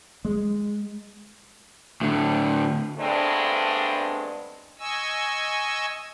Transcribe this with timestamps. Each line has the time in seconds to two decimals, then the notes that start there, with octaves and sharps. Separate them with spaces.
0.25 G#3
2.02 A2 D3
2.99 G2 G#3 A3 B3 C4 D4
4.79 D#5 G#5 C#6 E6